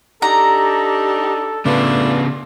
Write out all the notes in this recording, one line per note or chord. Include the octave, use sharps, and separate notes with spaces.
D4 D#4 G4 A4 A#5
C#3 A3 B3 D4 F4 B4